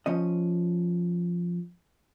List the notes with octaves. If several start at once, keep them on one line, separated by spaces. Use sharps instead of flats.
F3 C#4 D#5